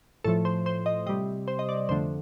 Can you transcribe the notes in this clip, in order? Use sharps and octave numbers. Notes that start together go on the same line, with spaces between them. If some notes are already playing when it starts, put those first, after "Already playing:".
A2 F3 A3 A4
C5
C5
D#5
C3 G3 D#5
C5
D#5
D5
F2 D3 A3 C5